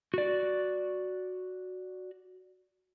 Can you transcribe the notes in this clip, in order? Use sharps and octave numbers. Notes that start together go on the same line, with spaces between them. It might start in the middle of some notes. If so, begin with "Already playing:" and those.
F#4 D5